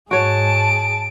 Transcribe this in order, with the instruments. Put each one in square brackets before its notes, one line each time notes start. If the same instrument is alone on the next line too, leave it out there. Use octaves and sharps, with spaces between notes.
[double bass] G#2 [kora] F#4 C#5 [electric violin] G#4 A5 [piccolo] D7